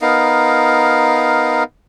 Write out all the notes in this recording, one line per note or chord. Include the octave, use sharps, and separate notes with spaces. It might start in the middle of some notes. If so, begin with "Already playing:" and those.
B3 D#4 A#4 F5